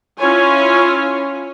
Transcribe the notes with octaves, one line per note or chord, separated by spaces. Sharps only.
C#4 E4 F4 C#5 G#5